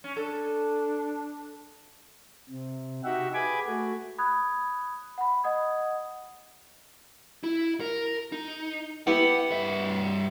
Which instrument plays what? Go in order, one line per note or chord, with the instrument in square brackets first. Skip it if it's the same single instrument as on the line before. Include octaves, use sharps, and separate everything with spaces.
[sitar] C#4
[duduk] D4 [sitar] A4
[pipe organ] C3
D#4 F#4 G4 E5 F#5
G#4 B4 G#5 B5 D6 G#6
A3 F#4
[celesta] B5 D#6 F#6 G#6
F#5 B5
D#5 F#5 D#6 G#6
[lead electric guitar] E4
A#4
D#4
[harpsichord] B3 E4 G4 [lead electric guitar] F#5
[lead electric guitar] G2 E5